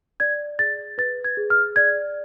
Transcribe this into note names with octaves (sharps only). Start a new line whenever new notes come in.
D5 G#6
G#4 A6
B4 A6
G#6
G#4
F6
D5 G#6